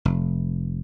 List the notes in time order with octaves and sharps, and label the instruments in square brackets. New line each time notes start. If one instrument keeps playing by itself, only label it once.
[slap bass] F1